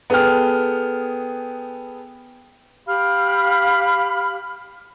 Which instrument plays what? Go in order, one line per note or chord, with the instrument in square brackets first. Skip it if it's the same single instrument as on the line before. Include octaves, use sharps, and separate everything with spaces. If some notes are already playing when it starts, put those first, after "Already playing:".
[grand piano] B3 G#4 A4 G5 F6
[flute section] G4 F5 B5 F6